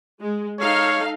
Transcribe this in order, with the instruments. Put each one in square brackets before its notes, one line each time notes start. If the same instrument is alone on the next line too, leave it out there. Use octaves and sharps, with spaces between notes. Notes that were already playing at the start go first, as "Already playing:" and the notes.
[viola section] G#3
[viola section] D#4 A4 F5 [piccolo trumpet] C#5